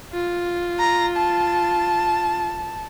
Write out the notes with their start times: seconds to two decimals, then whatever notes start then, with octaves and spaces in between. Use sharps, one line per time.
0.13 F4
0.79 A#5
1.17 A5